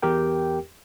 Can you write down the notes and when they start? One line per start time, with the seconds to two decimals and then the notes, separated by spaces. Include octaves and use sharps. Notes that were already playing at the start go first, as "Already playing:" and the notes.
0.02 E2 G4 A#4 G5